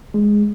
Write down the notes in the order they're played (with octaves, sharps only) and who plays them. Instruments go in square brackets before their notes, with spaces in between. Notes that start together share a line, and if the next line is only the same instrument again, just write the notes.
[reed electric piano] G#3